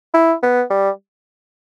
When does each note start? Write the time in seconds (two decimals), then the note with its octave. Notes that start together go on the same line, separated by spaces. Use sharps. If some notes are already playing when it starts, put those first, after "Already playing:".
0.14 E4
0.43 B3
0.70 G3